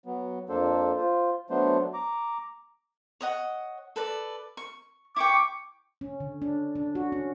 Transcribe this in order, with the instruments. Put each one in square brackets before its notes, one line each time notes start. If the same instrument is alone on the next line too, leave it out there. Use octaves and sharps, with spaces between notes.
[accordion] F#3 B3
F2 A#3 D4 A4 C5
F4 C5
F#3 A3 B3 D4 C5
A#5 D6
[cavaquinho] C#5 D#5 F#5
A4 B4 D5
C#6
[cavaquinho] E4 G5 [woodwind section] C#6 D6
[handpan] C#4
D3
D4
D4
F#4
C#4